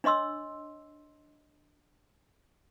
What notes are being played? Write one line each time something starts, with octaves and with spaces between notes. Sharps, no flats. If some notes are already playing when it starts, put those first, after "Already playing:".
D4 C#5 D#5 C6 E6